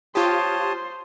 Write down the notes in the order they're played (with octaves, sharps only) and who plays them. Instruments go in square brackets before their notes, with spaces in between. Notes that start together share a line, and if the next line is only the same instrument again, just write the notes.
[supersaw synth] F4 G4 [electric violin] C5 [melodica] C#5 A5 D#6